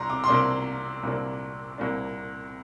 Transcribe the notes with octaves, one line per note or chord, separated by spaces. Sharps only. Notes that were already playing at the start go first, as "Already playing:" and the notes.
Already playing: C2 C3 D4 A#5 C6
D6
C6
C2 C3 A#3 D4 D6
C2 C3 A#3 D4
C2 C3 A#3 D4